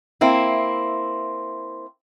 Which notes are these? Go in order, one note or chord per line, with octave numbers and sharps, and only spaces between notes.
A#3 C4 E4